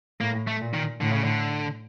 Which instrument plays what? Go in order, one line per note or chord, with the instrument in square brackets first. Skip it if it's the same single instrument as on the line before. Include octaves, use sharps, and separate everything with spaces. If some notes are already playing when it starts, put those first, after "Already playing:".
[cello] A2 [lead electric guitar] A#3
[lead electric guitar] A3
[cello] A#2
[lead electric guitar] D#3
[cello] A2 [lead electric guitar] D3
[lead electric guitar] C#3
D3